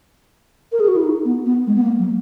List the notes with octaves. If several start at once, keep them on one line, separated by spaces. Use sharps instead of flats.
A#4
G#4
F#4
E4
D#4
B3
B3
G#3
B3
A#3
F#3